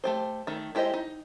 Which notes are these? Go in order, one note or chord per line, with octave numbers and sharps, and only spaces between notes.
A3 G4 C5
D#3 A3
G#3 E4 G4 C5 D#5
D#4